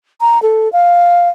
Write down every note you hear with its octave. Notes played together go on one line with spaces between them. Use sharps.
A#5
A4
F5